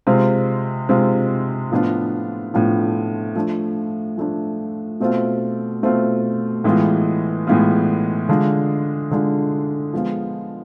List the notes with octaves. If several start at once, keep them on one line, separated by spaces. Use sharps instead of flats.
C3 G#3 C4 F4
C3 G#3 C4 F4
A2 F3 B3 D4 F4
A2 F3 B3 D4 F4
F3 A3 D4
F3 A3 D4
B2 A3 C4 F4
B2 A3 C4 F4
A2 E3 G#3 B3 F4
A2 E3 G#3 B3 F4
D3 G#3 D4 F4
D3 G#3 D4 F4
F3 G#3 B3 F4